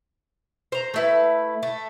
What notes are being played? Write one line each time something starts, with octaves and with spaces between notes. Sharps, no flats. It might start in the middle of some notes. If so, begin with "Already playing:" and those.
C5 A#5
A3 E4 B4
A3